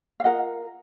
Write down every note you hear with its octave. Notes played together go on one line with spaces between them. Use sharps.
F5
F4 A#4 D#5 F#5